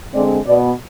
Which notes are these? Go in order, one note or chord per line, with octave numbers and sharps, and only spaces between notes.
D3 G#3 C4 D5
B2 B3 D5